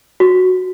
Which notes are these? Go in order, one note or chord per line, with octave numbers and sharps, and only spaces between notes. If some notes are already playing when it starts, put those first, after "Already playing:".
F#4